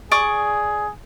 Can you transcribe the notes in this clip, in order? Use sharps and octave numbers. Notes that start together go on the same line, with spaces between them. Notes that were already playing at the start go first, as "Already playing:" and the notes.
G#4 D5 C#6 D#6